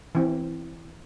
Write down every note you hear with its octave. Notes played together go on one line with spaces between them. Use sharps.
E3 C4